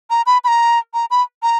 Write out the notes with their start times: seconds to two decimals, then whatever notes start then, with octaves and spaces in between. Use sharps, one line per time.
0.10 A#5
0.26 B5
0.44 B5
0.48 A#5
0.94 A#5
1.10 B5
1.43 A#5